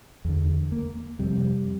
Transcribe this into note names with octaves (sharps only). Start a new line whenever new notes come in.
E2 D3
A#3
F2 C3 G3